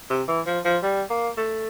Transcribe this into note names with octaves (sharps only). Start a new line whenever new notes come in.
C3
E3
F3
F3
G3
A#3
A3